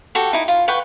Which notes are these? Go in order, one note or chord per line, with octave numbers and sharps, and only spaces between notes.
F#4 G4 A4 G5
D#4 E4
F4
B4 F#5 G5 C#6